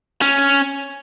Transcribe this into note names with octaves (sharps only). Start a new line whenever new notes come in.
C#4